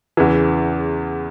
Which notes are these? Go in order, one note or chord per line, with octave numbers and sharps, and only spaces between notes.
E2 C#3 E3